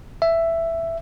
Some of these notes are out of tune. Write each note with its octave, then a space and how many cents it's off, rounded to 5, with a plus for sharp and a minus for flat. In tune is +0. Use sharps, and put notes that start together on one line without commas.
E5 +10